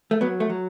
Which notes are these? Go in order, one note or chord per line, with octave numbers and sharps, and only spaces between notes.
A3
F#3 B3
A3
F#3